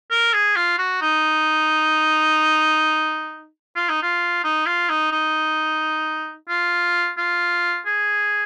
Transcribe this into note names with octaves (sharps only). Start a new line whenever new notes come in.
A#4
G#4
F4
F#4
D#4
F4
D#4
F4
D#4
F4
D#4
D#4
F4
F4
G#4